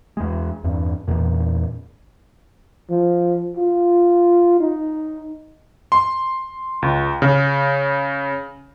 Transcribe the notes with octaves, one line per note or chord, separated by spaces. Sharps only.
E2 G#3
E2 G2
E2 A#2
F3
F4
D#4
C6
C#2
C#3